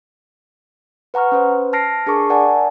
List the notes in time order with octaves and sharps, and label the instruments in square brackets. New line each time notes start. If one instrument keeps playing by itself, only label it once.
[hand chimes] B4 F#5 A#5 C#6 F6
C#4 B4 C5
A5 F6 A#6 C7 D7
D4 G#4 A#4 A5 C#6 D6
A#4 D5 F#5 G#5 A5